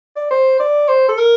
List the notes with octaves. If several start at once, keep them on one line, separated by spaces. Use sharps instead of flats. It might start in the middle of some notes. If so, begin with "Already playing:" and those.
D5
C5
D5
C5
A4
A#4